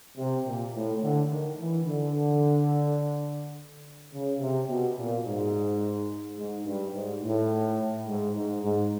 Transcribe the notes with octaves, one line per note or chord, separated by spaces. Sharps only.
C3
A#2
A2
D3
D#3
E3
D3
C#3
C3
B2
A#2
G#2
G#2
G2
G#2
A2
G#2
G#2
G#2